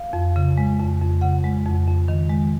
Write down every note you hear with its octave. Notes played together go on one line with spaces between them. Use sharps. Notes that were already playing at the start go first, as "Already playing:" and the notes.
Already playing: F5
F2
C#3
G#3
F2
F2
C#3 F#5
G#3
F2
F2
D#3
G#3